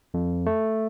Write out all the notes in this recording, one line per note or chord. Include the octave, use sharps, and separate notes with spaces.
F2
A3